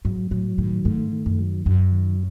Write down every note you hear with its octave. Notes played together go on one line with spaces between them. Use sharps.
G#2 F#3
A2 F#3
A2 D#3
G#2 A3
D#3
F#2
F#3
F#2 F#3
D#3